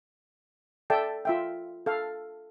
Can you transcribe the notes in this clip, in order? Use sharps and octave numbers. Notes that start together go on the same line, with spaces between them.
A4 D5 E5 G5 A5
F4 E5 G5
A4 F5